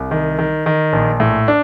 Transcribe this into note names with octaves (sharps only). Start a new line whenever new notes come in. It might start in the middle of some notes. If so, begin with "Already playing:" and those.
Already playing: C2
D#3
D#3
D#3
A#1
A2
D4